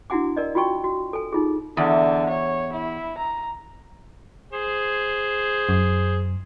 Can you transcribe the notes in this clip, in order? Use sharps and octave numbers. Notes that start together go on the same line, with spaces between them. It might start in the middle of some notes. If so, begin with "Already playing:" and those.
D4 E4 F#4 F#5 G#5 D6
A#4 D5 D#5
F4 F#4 G5 C#6
F#4
A4 G#5
D#4 F4 G#4
E2 D3
C#5
E4
A#5
G#4 C5
F#2